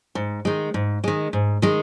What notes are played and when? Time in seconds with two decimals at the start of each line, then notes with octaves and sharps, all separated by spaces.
0.15 G#2
0.45 D#3 G#3
0.74 G#2
1.04 D#3 G#3
1.33 G#2
1.62 D#3 G#3